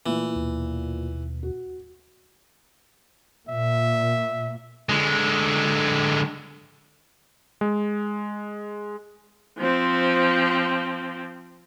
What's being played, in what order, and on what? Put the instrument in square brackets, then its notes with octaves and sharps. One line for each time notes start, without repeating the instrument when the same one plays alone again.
[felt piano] A#2 [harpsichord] E3 [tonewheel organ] A3 E4
[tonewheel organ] D#2 B2
[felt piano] F#4
[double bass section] A#2 [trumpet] E5
[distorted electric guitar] D3 G#3
[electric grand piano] G#3
[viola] F3 C4